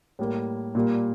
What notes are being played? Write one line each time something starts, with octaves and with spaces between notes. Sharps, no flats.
A2 G3 A#3
A#2 G3 A#3